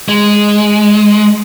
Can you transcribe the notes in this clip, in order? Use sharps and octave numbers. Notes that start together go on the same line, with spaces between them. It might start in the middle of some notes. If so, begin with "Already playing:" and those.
G#3